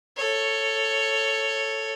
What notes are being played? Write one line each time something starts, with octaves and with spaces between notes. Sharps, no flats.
A4 C#5